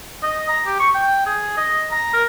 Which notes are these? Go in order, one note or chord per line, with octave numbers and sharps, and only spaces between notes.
D#5
A#5
G4
C#6
G5
G#4
D#5
A#5
A#4